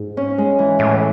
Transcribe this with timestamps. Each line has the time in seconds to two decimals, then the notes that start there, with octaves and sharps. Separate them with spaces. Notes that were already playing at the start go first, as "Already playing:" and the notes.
Already playing: G#2
0.17 C#4
0.38 G#3
0.59 E3
0.79 A2 E3